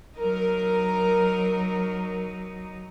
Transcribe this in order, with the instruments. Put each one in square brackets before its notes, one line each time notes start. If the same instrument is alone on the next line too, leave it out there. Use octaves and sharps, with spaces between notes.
[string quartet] F#3 D#4 [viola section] A#4